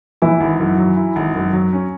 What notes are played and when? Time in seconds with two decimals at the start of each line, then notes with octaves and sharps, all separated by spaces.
0.22 E3 E4
0.41 G#1
0.60 F#2
0.78 F#3
0.97 E4
1.16 G#1
1.35 F#2
1.53 F#3
1.73 C#4